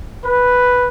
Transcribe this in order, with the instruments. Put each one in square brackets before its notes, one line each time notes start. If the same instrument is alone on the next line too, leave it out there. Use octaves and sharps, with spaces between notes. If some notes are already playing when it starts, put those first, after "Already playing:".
[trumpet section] B4